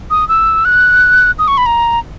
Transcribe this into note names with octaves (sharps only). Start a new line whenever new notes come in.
D#6
E6
F#6
D#6
C#6
B5
A#5